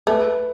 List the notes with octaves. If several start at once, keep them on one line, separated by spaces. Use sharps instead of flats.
A3 B4